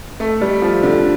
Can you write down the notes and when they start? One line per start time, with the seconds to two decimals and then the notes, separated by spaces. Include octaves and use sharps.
0.20 A3
0.41 G3
0.62 F3
0.83 D3